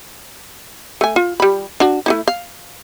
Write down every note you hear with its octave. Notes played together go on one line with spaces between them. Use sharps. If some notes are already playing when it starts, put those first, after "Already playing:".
A3 G#5
F4
G3 B5
D4 F#4
A3 D#4 E4
F5